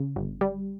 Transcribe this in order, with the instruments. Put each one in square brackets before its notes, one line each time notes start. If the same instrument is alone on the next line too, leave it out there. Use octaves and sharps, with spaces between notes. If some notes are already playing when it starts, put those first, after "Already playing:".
Already playing: [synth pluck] C#3
G1
G3